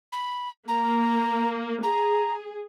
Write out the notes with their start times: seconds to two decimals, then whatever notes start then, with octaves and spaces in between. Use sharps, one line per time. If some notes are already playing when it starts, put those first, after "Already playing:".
0.12 B5
0.68 A#3 A#5
1.83 G#4 A#5